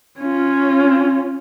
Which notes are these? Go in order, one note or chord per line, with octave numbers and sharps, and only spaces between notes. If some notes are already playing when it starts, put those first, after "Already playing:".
C#4 F4